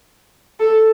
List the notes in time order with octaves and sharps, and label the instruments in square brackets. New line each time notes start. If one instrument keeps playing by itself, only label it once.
[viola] A4